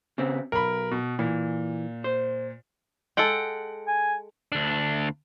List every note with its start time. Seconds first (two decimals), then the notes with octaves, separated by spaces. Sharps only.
0.18 C#3 B3 C4
0.52 B1 A#4 B5
0.91 B2
1.19 A#2 E3
2.04 C5
3.17 G#3 A4 F#5 G5
3.87 G#5
4.52 D2 D4